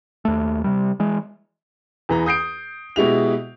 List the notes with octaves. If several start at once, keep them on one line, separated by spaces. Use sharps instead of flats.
D#2 A3
C3 G3
E3 G#3
E2 E3 A#5
D#6 G6 C7 D7
B2 G#3 E4 G4 F7